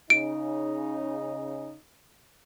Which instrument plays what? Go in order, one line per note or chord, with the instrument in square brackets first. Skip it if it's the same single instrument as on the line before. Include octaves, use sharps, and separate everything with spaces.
[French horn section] C#3 D#4 [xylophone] D7